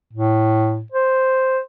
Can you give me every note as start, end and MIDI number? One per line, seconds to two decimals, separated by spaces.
0.13 0.82 45
0.92 1.59 72